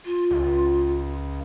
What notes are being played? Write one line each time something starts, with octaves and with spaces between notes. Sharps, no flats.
F4
C#2